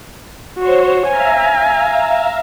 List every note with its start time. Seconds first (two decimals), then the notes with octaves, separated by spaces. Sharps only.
0.59 F#4 C5 C#5
1.08 E5 F5 G#5 A#5